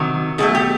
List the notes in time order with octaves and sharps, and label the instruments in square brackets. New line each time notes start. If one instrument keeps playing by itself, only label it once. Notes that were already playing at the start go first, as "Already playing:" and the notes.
Already playing: [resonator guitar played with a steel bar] C3 D#3 F#3
B2 F#3 A3 G#4
G4